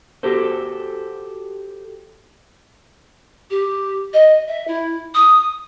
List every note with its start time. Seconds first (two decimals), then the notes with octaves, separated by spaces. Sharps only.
0.23 F#4 G4 A4 C5
3.50 G4
4.13 D#5
4.48 E5
4.67 E4
5.14 D#6